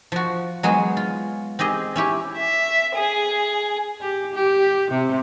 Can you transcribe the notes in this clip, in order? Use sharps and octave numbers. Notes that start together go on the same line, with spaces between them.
F3 F#4
F#3 G#3 B3 G#4 C5
F4
C4 G4 G#4 D#5
C#4 E4 G4
E5
G#4
G4
G4
C3